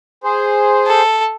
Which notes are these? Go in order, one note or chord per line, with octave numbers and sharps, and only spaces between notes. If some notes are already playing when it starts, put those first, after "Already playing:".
G#4 C5
A4